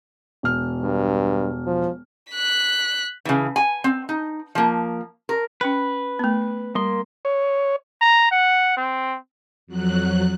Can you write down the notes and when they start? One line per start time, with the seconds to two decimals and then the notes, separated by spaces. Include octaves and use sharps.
0.43 E1 F6
0.81 G2
1.66 F3
2.32 F#6 B6
3.25 C#3 E3
3.56 G#5
3.84 C4
4.09 D#4
4.55 F3 A#3
5.29 A#4
5.61 C#4 B4 G5 B5
6.19 A3 B3
6.75 G3 A#3 C6
7.25 C#5
8.01 A#5
8.31 F#5
8.77 C4
9.67 F2 F#3 F#6